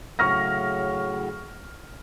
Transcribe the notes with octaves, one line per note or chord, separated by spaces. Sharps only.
A2 C#3 F#3 C#6 F6 A#6